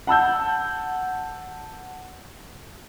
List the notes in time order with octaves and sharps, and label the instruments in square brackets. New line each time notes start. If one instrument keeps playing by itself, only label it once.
[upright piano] F#5 A5 E6 G6